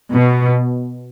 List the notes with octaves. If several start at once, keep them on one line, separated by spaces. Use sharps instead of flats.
B2